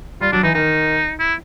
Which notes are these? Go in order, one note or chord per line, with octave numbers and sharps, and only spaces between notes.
G3 F4
F#3 D4
E3 D#4
D#3 D#4
E4